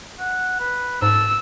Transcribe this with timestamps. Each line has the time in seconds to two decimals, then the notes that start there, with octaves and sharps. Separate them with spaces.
0.20 F#5
0.60 B4
1.02 G#2 A4 E6